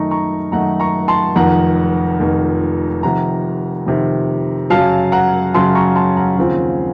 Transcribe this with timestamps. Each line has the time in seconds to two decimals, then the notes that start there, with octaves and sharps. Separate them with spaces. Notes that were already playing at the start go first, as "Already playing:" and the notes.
Already playing: F#2 D#3 A3 D#4 A#5 C#6
0.11 A#5 C#6
0.52 F#2 D#3 A3 D#4 F#5 A#5
0.80 A#5 C#6
1.08 A5 C6
1.35 F1 F2 D#3 F#5 A#5
2.20 F1 F2 D#3
3.03 F2 C3 D#3 F#5 A#5
3.87 F2 C3 D#3
4.70 F#2 C#3 F#3 F5 A5
5.12 F#5 A#5
5.54 F#2 C#3 F#3 A5 C6
5.75 A#5 C#6
5.96 A5 C6
6.17 F#5 A#5
6.38 D#2 C#3 F3 C4 F4